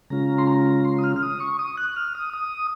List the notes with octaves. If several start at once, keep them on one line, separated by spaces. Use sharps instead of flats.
C#3 G#3 C#4 F4 A#5
C6
A#5
C6
D#6
F6
F6
D#6
C#6
D#6
F#6
F6
D#6
D#6